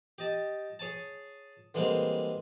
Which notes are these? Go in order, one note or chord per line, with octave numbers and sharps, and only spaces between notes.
G4 D#5 A5
G#4 C#5 G#5 A5
D3 E3 G3 G#3 A#3 C4